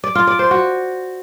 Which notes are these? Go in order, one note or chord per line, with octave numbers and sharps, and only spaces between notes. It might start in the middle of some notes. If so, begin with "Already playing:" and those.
D5
F4
D5
C5
F#4